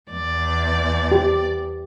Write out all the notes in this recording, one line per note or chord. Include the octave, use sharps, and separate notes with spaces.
E2 D5
G4